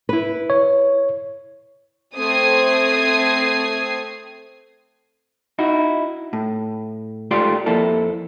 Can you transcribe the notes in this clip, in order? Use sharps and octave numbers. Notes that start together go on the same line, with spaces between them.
E4 B4
C#5
A3 C4 D#6 G#6 C7
D#4 E4 F#4
A2
G#2 A3 F4 G4 D5 C6
F2 A#3 E4 A4